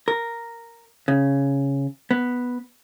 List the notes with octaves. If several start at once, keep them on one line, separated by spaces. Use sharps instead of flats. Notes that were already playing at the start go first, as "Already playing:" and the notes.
A#4
C#3
B3